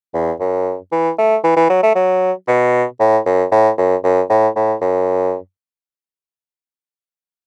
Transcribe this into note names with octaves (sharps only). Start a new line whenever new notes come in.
E2
F#2
E3
A3
E3
E3
F#3
A3
F#3
B2
A2
F#2
A2
F#2
F#2
A2
A2
F#2